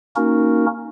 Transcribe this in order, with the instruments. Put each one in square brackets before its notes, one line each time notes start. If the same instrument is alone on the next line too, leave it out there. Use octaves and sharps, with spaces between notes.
[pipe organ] A#3 C#4 D#4 F#4 A#4